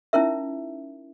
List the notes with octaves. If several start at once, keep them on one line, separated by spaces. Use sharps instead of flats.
C#4 D#4 E4 A#4 E5